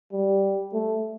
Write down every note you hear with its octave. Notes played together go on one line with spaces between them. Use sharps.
G3
A3